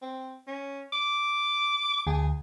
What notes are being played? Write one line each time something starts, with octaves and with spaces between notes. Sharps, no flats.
C4
C#4
D6
D2 G#4